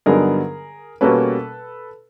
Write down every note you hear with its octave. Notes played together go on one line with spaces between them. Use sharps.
G2 D3 F#3 B3 D#4 G#4 A#4
B2 G3 A#3 C#4 A4 B4